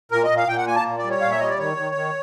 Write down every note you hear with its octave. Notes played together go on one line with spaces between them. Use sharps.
A#2 A#4
D#5
A#2
F5
A#2 G5
F#5
A#3 G#5
A5
A#2
D5
G3
C#5
A#2 F5
E5
G3 D#5
D5
D#3 C#5
D#3
D#3